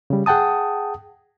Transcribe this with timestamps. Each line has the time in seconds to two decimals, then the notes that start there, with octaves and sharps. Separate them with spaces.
0.10 C#3 G3
0.26 G#4 F#5 G5 A5 D#6